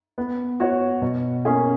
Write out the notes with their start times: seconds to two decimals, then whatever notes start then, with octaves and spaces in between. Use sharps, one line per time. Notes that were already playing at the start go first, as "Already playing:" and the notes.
0.18 B3
0.60 F#4 C#5
1.02 B2
1.45 A#3 C#4 G#4